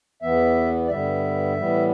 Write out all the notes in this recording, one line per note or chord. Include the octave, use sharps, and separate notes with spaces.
E2 E3 B3 E5
D5
G2 D3 G3 B3 E5
A2 E3 G3 B3